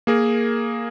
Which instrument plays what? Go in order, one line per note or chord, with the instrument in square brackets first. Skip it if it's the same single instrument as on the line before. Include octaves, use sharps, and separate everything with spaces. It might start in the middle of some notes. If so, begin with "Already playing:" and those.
[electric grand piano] A#3 G#4 A#4